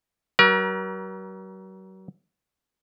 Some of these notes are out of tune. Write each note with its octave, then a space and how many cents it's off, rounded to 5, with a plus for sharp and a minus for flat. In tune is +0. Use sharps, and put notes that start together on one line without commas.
F#3 +35 A#4 +40